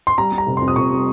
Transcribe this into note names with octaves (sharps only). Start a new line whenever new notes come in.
C6
G3 A#5
G3
A#5
F1
F2 C6
D#6
F1 C#6
G3